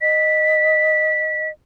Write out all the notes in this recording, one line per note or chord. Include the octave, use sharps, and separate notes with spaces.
D#5 B6